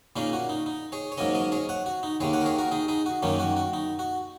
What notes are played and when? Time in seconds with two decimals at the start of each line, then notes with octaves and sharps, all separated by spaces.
0.16 A#2 A#3 C#4 D#4 G#4
0.33 F#4
0.49 D#4
0.66 D#4
0.92 G#4 C#5
1.12 C#5
1.17 G#2 F#3 A#3 C#4 A#4 D#5
1.35 A#4 D#5
1.52 G#4 C#5
1.69 C#5 F#5
1.86 F#4
2.03 D#4
2.20 D#2 D#3 A#3 G#4 C#5
2.33 C#5 F#5
2.41 A#4
2.46 G#4 C#5
2.58 F#4 A#4
2.71 D#4 G#4
2.88 D#4 G#4
3.06 F#4
3.22 F#2 D#3 A#3 C#4 D#4
3.39 F#4
3.57 F#4
3.73 D#4
3.99 F#4